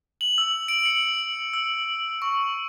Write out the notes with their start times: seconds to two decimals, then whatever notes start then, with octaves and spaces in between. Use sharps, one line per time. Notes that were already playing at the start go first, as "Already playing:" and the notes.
0.21 F#7
0.38 E6
0.68 D7
0.86 C#7
1.54 E6
2.22 C#6